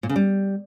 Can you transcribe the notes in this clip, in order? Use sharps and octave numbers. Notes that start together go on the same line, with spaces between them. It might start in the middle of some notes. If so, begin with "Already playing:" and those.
A#2
C#3
G3